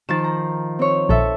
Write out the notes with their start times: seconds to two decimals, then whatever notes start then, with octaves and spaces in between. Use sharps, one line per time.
0.09 D#3 F3 A6 E7
0.24 A#5
0.79 C4 C#5
1.09 A#1 A4 E5 A5